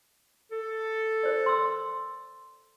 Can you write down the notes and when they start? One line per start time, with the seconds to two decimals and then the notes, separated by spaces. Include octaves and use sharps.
0.51 A4
1.23 A#4 C5 D5
1.46 C6 E6